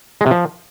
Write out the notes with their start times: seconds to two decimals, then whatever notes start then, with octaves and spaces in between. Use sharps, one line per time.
0.21 G#3
0.26 C3
0.31 F3